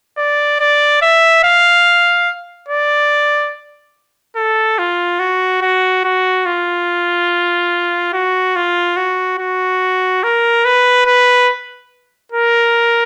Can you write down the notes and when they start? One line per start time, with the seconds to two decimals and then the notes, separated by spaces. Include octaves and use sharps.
0.18 D5
0.60 D5
1.02 E5
1.44 F5
2.68 D5
4.36 A4
4.78 F4
5.20 F#4
5.62 F#4
6.05 F#4
6.46 F4
8.13 F#4
8.56 F4
8.97 F#4
9.38 F#4
10.23 A#4
10.65 B4
11.06 B4
12.32 A#4